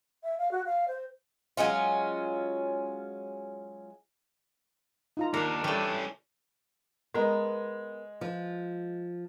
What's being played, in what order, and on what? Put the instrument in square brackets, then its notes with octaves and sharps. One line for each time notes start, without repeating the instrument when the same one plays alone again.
[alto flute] E5
F5
F#4
F5
C5
[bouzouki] F#3 G#3 C#4 F4
[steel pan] D#4 F4 A#5
[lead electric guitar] D#2 [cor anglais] D4 [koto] A#4
[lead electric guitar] E3 C#4 [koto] G3 A3
[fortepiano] G#3 [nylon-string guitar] B3 A#4
[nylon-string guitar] F3